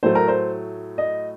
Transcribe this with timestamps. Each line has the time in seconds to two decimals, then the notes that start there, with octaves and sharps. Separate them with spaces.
0.03 A2 F#3 A3 C5
0.15 A#4
0.28 C5
0.98 D#5